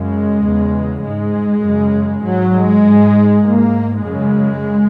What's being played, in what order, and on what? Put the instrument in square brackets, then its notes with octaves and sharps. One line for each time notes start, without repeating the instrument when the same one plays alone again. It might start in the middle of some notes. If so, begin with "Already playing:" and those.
Already playing: [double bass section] F#2 C#3 G#3
E2 C#3
G#2 G#3
F#2 C#3
G#2 F#3
G#3
G#2
G#2 A#3
F#2 C#3 G#3